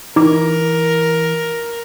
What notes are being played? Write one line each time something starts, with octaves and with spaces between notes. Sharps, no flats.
E3 D#4 A#4 D6